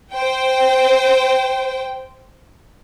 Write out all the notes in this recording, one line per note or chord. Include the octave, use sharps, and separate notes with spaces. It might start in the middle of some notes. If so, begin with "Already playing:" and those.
C5 G5